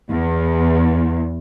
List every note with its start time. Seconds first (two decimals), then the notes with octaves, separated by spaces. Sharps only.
0.10 E2